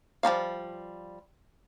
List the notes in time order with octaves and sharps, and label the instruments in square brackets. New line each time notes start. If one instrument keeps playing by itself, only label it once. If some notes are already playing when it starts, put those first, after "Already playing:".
[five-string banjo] F3 G3 C#4 F5